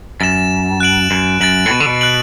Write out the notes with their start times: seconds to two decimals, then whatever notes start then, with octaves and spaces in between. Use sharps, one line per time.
0.20 F#2 A6 E7
0.80 F#6 D7 F#7
1.11 F#2
1.41 F#2 A6 D7 F#7
1.66 A2
1.71 B2
1.80 D3
1.86 B2
2.01 F#6 D7 F#7